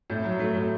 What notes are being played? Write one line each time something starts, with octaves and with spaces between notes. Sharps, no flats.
A2
F#3
A3
A2